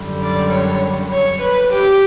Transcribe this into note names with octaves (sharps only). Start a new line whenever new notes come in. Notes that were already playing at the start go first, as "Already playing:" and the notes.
Already playing: F#2 D3 G3
D5
C#5
C#5
B4
G4